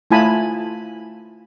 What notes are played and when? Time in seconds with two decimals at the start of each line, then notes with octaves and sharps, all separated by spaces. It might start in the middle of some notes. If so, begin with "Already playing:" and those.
0.11 A3 E4 F4 G#5 A5 B5